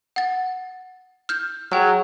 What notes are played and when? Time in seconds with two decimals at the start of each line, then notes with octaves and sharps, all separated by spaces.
0.16 F#5 A6
1.29 F6 G6
1.72 F#3 G#4 G5 F6